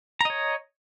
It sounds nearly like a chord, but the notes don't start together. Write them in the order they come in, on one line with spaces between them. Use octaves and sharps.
A#5 D#5 C#5